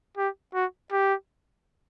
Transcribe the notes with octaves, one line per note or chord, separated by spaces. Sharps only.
G4
F#4
G4